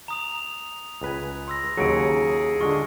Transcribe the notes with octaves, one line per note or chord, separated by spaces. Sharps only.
A#5 D#6 F7
C#2 B4 G#5
C6 E6 A#6
D#2 C#3 F#3 G#4 C#7 D7
D3 G#3 F4 C#6